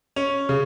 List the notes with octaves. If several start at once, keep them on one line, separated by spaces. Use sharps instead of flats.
C#4
C#3